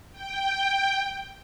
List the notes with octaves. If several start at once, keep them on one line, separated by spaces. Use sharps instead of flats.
G5